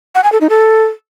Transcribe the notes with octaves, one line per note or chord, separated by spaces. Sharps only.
F#5
G#5
A4
D#4
A4